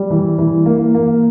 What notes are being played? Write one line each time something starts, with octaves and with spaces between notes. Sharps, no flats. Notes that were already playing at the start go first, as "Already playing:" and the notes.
Already playing: G3
E3
E3
A#3
A#3